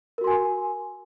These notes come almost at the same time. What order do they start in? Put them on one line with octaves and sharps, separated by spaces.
A#4 F#4 C6 G#5